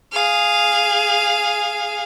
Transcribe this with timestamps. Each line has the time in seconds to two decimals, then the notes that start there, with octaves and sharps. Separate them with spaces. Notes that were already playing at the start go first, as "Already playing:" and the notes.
0.12 G#4 F5